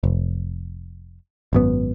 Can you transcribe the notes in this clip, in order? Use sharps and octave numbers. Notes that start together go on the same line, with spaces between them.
F1
G#1 F#2 B3